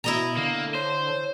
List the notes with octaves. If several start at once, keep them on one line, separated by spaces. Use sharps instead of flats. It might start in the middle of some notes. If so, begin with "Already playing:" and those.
B2 B3 E4 D#5 A#5
D3 A#3
C5 C#5